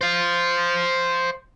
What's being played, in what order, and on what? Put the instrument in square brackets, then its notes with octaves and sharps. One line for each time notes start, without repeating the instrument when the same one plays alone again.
[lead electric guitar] C5 F5